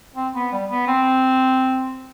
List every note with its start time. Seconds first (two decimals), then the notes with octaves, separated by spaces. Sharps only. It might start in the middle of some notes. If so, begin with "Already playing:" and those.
0.16 C4
0.35 B3
0.52 G3
0.70 B3
0.87 C4